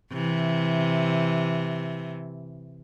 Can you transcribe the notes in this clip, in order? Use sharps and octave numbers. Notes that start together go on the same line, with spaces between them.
C3 E3